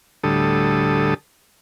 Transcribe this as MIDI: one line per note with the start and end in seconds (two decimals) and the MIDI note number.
0.24 1.14 38
0.24 1.14 45
0.24 1.14 50
0.24 1.14 55
0.24 1.14 69
0.24 1.14 87